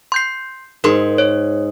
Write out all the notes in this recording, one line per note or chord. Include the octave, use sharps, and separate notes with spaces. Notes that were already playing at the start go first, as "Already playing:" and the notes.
C6 G6 C7
G#2 A#4 C6
C#5